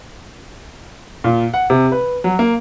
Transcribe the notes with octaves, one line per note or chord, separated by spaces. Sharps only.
A#2
F#5
C3
B4
F#3
A#3